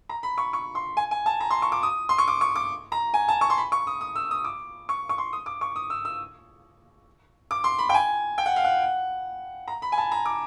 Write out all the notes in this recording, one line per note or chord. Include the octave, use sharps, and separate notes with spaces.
A#5
B5
C#6
C#6
C6
G#5
G#5
A5
A#5
C6
C#6
D6
D#6
C6
C#6
D6
C#6
D6
A#5
G#5
A5
C#6
C6
B5
C#6
D#6
D#6
E6
D#6
D6
C#6
C#6
C6
D#6
D6
C#6
D#6
E6
E6
D6
C6
B5
G5
G#5
G5
F#5
F5
F#5
A#5
B5
G#5
A5
A#5
D6